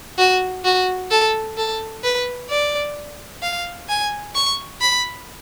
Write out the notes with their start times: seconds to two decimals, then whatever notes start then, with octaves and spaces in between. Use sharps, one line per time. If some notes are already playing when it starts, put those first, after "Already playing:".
0.18 F#4
0.65 F#4
1.11 A4
1.57 A4
2.04 B4
2.50 D5
3.43 F5
3.89 G#5
4.35 C#6
4.81 B5